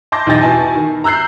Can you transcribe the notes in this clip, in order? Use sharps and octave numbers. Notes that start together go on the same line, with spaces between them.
A5 C6 D6 G6 A#6
B1 E2 D#4 G5 A6 A#6
B2 E4 G#5 A5
D#3
A#5 E6 F#6 G6 C7